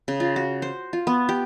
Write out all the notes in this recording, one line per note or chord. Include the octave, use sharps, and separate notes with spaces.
C#3
F4
F#4
C5
F4
B3
G4